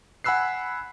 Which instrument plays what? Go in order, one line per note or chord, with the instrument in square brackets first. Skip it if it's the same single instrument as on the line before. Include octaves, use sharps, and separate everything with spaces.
[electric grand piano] F#5 G#5 B5 E6 F#6 C7